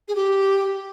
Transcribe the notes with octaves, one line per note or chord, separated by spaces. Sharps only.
G#4
G4